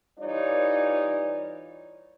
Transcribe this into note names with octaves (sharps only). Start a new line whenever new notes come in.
E3 G3 D#4 F4 C#5 D5